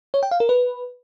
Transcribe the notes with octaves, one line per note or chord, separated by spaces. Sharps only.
C#5
G5
F5
A#4
B4